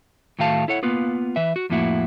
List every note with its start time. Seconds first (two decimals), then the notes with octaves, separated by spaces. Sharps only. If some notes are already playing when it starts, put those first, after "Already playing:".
0.39 A2 D#3 A3 F#4 F5 A5
0.68 E4 A4 C#5 F#5
0.83 A#3 B3 F4 B4
1.36 E3 B4 E5
1.56 F#4
1.70 F2 A2 F3 A#3 E4 F#4